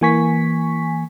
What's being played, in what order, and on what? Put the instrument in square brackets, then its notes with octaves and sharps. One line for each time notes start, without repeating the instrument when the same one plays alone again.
[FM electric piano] E3 A#3 G#5 C#6 B6